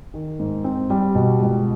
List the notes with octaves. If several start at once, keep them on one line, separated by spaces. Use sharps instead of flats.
D#3
G#2
C4
G3
B2
C#2